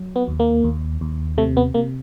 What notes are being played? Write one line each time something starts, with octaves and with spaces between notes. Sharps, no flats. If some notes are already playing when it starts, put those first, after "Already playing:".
Already playing: F#3
B3
D#2
A#3
D#2
D#2
C3 A3
B3
C3 A#3